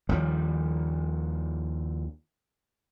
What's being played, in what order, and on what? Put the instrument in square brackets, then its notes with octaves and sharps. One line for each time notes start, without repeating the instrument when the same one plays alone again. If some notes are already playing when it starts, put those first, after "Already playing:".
[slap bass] D#2 D#3 F3 G3